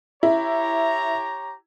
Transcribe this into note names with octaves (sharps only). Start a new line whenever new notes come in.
E4 G4 C#5 A#5